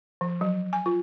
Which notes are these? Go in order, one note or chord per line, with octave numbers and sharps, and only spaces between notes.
F3
F#3
G#5
F4